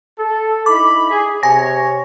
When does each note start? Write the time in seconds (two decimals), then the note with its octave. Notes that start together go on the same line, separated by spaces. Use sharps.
0.19 A4
0.66 D#4 E4 B5 D6
1.10 G#4
1.43 C3 C#5 G#5 A#6